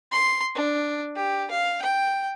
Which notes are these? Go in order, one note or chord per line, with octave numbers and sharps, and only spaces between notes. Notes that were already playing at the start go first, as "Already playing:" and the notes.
C6
D4
G4
F5
G5